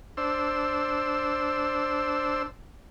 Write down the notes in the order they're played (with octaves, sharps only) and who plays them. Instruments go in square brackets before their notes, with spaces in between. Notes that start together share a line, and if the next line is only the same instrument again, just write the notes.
[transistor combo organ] D4 C5 E6